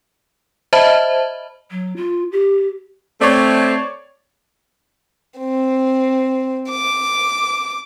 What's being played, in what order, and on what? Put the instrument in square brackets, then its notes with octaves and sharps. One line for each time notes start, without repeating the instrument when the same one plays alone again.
[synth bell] C5 D#5 E5 A5 B5
[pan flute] F#3
F4
G4
[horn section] A3 C4 [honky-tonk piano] C#5 D5
[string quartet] C4
D6